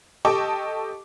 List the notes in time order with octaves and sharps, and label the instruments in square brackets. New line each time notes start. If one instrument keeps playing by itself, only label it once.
[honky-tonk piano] G4 A4 D#5 A5 C#6 D6